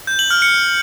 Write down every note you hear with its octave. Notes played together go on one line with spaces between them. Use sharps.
G6
F#7
F6
C#7